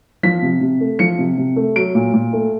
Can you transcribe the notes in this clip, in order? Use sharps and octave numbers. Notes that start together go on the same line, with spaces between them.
F3 B6
C3
C3
A3
F3 C#7
C3
C3
A3
F#3 D7
A#2
A#2
A3